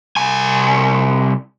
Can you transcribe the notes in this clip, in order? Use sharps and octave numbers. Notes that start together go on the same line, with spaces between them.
C2 G#5